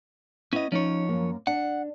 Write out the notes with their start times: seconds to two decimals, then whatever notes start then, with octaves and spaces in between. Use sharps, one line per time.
0.53 B3 C#4 E4 D#5
0.72 F3 C#4 D#4 C#5
1.09 F#2 A#3
1.47 D4 F#5